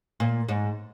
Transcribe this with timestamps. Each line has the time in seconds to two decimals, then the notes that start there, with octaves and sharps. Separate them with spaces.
0.20 A#2
0.49 G#2